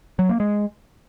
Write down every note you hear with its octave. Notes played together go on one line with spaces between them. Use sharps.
F#3
A#3
G#3